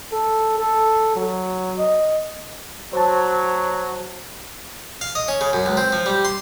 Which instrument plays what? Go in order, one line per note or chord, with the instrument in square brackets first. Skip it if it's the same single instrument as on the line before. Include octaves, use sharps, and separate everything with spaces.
[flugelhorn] A4
A4
F#3
D#5
[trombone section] F#3 [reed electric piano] C5 A5
[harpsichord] F5
D#5
C#4
C#3
F#2
C#2
C4
F3
G3
C6